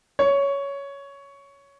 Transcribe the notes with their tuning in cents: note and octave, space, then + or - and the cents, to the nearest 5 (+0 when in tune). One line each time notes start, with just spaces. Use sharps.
C#5 +10